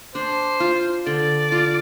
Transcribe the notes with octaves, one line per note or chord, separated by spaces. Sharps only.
D4 C5
F4
D3 D5
F4